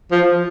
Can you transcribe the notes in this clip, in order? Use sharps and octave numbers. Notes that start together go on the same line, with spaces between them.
F3